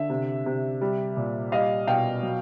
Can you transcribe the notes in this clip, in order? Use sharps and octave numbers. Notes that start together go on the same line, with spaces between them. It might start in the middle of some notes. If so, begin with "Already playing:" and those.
Already playing: D3 E5
C3
C3
G3
A#2
G3 D#5 F5
B2 F5 G5
F#3